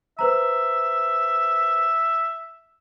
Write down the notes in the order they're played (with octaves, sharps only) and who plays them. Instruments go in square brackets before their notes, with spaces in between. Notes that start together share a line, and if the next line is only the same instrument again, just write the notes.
[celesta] B4 C5 A#5 [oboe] E5